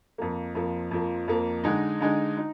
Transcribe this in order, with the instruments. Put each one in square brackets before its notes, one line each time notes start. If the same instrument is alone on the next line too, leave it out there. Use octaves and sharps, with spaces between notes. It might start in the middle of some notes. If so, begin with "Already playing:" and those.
[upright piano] F2 F3 A#3
F2 F3 A#3
F2 F3 A#3
F2 F3 A#3
D3 G#3 D#4
D3 G#3 D#4
D#4